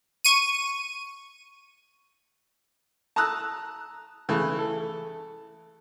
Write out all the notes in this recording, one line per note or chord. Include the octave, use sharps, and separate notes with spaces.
C#6 D#7
A5 A#5 D#6 E6 F#6
C#3 E3 A3
A4